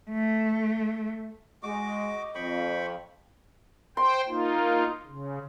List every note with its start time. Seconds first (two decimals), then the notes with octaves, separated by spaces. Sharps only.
0.11 A3
1.63 G#3 F#4 D#5 D6
2.35 F2 G5 B5 C#6
3.97 C5 G5 C6
4.28 A#3 D#4 F4
5.07 C#3